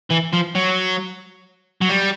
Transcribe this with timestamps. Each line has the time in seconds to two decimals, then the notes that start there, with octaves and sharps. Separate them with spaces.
0.11 E3
0.33 F3
0.55 F#3
1.81 F#3
1.89 G3